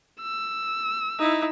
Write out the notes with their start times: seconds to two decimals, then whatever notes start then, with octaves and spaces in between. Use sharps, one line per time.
0.22 E6
1.19 D#4 E4